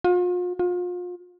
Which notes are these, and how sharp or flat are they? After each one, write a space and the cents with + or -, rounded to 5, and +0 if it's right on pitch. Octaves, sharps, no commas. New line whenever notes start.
F4 +40
F4 +35